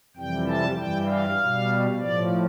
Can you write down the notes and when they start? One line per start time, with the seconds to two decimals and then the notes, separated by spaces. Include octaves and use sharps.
0.17 F2 C3 E3 G3 G5
0.47 A5
0.77 G2 E3 G3 G5
1.07 F5
1.38 B2 G3
1.97 A2 F3 D5